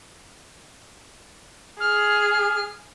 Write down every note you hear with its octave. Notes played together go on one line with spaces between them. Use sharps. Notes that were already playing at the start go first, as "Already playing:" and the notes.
G#4 F6